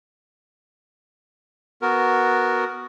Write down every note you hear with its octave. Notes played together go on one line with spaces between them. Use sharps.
B3 F#4 A#4